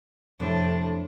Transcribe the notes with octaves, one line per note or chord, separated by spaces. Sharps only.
F2 A2 C3 D4